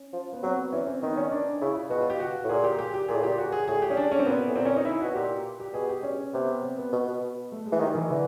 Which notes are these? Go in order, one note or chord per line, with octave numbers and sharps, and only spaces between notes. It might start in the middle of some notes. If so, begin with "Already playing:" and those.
Already playing: C#4
F3
B3
F#3 C4
B3
E3 C#4
C4
D#3 B3
C#4
D4
C#3 E4
F4
B2 F#4
F4
G4
F#4
A2
A#2 G#4
G4
G4
G4
A#2 G#4
A2
A#2 G4
F#4
G#4
A2 G#4
G4
C#4
D4
C#4
C4
A#2 B3
A2
A#2 C4
C#4
D#4
E4
B2 F#4
A#2 G4
G4
B2 G#4
G4
C#4
C3 B3
C4
B3
B2
B2
A3
G#3
E3
D#3 G3
E3
D3 E3